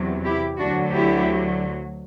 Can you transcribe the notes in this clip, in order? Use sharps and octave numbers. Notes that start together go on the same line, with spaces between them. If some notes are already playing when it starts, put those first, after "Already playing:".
Already playing: E2 C3 F#3
E4 G4
D2 D3 F#3 D4 F#4
E4 G4